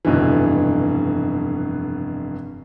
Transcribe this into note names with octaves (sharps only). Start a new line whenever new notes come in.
F1 G2 B2 D3 E3